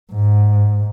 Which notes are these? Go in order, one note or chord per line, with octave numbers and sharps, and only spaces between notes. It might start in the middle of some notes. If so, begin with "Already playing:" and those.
G#2